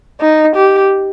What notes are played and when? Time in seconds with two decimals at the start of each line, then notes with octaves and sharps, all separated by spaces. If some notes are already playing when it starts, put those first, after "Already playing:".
0.21 D#4
0.56 G4